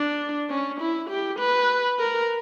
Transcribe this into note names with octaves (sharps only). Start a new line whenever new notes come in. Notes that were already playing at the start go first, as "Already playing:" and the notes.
Already playing: D4
C#4
E4
G4
B4
A#4